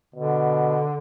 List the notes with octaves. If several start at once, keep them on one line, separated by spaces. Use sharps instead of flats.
B2 D3